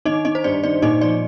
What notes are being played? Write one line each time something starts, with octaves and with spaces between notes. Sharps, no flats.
D#3 D#4 D#5
D#3 D#4 D#5
C5
G2 D5
D#3 D5
A#2 D#4 D#5
F3 D5